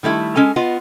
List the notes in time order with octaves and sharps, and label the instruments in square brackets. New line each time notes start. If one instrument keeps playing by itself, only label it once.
[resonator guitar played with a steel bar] D#3 G3 A3 E4
G#3 C#4 A4 G#5
B3 F4 D#5